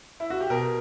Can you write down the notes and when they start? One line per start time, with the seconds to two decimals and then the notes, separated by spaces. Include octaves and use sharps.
0.20 E4
0.30 F#4
0.40 G4
0.50 B2 A#4